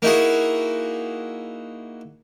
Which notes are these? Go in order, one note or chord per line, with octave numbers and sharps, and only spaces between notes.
A#3 D#4 E4 F#4 G#4